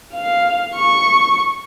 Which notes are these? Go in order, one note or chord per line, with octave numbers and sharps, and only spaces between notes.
F5
C#6